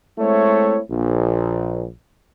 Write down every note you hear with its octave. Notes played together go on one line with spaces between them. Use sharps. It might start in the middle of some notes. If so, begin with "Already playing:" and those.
G#3 A3 C4 E4 C#5
A#1